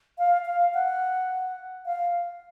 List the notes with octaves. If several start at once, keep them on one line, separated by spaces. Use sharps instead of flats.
F5
F5
F#5
F5